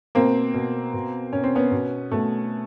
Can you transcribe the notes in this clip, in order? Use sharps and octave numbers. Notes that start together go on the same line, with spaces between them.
B2 A#3 C4
B2
B2
B2 C#4
C4
B3 C#4
B2
B2 A3